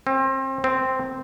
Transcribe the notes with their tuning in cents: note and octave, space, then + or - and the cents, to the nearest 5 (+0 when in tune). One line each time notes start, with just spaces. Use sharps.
C4 +30
C4 -5